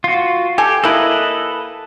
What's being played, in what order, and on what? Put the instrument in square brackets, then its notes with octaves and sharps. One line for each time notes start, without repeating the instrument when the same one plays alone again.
[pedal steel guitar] F4 F#4
[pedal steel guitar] G4 [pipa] A4 G#5
[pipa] A#3 E4 [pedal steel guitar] A4 B4 D#5